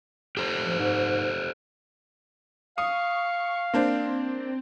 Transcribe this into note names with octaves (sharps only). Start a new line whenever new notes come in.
G4 A4 C5
F3
G#2
F5 C#6 D#6
A#3 C4 D4 C5